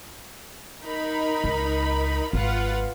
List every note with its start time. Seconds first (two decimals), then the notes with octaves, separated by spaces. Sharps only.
0.83 D#4 A#4 B5
1.44 C#2
2.33 G#1 F4 B4 F#5